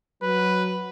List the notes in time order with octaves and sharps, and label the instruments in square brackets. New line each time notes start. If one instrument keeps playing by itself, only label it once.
[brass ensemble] F#3 [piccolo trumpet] B4